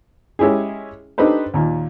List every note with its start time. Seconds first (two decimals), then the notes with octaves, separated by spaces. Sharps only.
0.39 G#3 C#4 E4 G4 G#4
1.18 D4 D#4 G4 A4 B4 C5
1.54 D#2 A#2